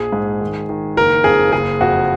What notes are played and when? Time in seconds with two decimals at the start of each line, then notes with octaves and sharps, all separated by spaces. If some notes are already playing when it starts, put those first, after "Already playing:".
Already playing: A#1 G#4
0.12 G#2
0.41 D#3
0.69 D#3
0.97 F#1 A#4
1.24 F2 G#4
1.52 F#1 G#4
1.81 F2 F#4